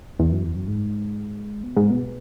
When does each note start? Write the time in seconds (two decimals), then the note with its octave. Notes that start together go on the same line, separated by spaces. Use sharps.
0.19 E2
0.32 F#2
0.44 E2
0.56 F#2
0.68 G#2
1.64 B2
1.76 G#2
1.91 B2